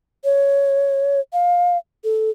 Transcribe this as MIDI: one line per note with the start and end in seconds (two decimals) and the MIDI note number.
0.24 1.20 73
1.33 1.77 77
2.04 2.30 69